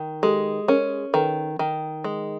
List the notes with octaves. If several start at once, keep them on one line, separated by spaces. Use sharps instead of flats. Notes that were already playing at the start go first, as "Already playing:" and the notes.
Already playing: D#3
G#3 G4 A4
C#4 G#4 A#4
D#3 A4 B4
D#3
G#3